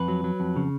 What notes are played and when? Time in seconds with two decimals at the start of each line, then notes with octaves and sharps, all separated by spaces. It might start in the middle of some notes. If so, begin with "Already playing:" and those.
Already playing: F2 B4
0.08 F#3
0.24 F#3
0.40 F2
0.56 C#3